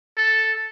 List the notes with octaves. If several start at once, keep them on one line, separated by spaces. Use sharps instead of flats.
A4